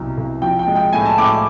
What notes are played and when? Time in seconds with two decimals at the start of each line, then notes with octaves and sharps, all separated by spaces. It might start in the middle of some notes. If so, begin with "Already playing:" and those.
Already playing: C2 B2 F#3
0.18 C2
0.42 F3 G5
0.59 G5
0.67 G#3
0.76 G5
0.93 A2 G#5
1.06 A5
1.18 A2 D6